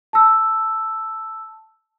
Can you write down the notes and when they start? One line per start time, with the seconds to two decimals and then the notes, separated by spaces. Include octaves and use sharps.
0.13 A5 E6